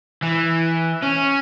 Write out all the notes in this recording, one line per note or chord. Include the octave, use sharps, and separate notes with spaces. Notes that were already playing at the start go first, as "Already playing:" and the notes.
E3
C#4